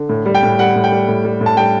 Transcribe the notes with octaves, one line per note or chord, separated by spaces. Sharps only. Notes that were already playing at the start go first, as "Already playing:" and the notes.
Already playing: D3
A2
G3
G5
A2
G3 F#5
A2
G5
G3
A2
G3
A2
A5
G3 G5